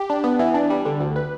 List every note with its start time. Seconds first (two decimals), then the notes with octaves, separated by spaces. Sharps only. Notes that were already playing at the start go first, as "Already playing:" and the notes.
Already playing: G4
0.10 D4
0.24 B3
0.39 E3
0.54 D4
0.70 G3
0.86 D3
1.01 D2
1.16 B4